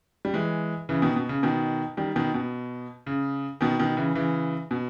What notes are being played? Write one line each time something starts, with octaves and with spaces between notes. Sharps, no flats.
G3
E3 G#3
C#3 E3
B2 D#3
B2
C#3
B2 D#3
D#3 G3
B2 D#3
B2
C#3
B2 D#3
B2 D#3
C#3 E3
C#3 E3
B2